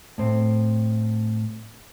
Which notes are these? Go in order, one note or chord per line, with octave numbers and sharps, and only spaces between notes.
A2 C4